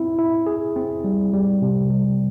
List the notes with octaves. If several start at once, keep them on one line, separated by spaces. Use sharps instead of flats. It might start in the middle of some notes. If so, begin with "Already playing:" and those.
Already playing: C4 E4
E4
G#4
C4
G3
G3
C3
G3